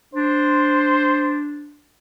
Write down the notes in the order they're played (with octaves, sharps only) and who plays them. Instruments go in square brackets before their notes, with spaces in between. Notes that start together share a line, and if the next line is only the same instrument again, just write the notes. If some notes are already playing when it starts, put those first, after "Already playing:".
[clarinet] D4 [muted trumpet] C5